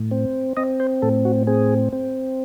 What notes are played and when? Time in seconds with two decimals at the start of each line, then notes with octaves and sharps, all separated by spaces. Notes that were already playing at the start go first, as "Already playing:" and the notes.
Already playing: A2
0.11 C4
0.57 C4 D#5
0.80 C5
1.02 A2 A4
1.25 F#4
1.47 C4 G#4
1.93 C4